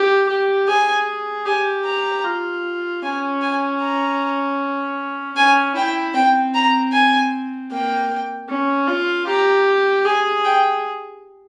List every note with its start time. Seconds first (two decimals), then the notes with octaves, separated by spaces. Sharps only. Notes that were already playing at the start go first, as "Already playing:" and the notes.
Already playing: G4
0.29 G4
0.68 G#4 G#5
1.46 G4 G#5
1.85 A#5
2.24 F4
3.02 C#4 G#5
3.42 G#5
3.81 A#5
5.36 C#4 G#5
5.76 E4 G5
6.14 C4 G5
6.54 A#5
6.92 G#5
7.71 A#3 G5
8.49 C#4
8.88 F4
9.27 G4 A#5
10.05 G#4 G#5
10.44 G5